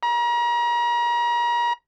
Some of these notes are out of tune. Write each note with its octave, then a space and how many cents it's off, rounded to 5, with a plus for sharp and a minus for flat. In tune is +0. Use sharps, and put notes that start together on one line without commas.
A#5 +35